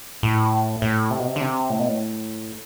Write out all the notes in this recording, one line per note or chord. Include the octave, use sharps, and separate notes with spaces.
A2
A2
C3
B2
C3
D3
C3
A2
B2
A2